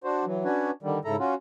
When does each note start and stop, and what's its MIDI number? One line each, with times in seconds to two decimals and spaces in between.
0.04 0.25 62
0.04 0.25 66
0.04 0.25 72
0.25 0.44 52
0.25 0.44 54
0.44 0.71 61
0.44 0.71 62
0.44 0.71 66
0.44 0.71 71
0.44 0.71 73
0.83 0.99 50
0.83 0.99 51
0.83 0.99 55
1.05 1.16 44
1.05 1.16 49
1.05 1.16 64
1.05 1.16 69
1.05 1.16 82
1.19 1.35 61
1.19 1.35 65
1.19 1.35 66